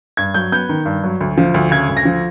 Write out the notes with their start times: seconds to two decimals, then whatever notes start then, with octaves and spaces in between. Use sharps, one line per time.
0.17 G2 G#6
0.34 F#3 G6
0.52 B3 G6
0.69 D#3
0.86 G2
1.04 F#3
1.21 D2
1.38 F3
1.54 D2
1.71 C#3 G#6
1.89 D2
1.97 A#6
2.05 F3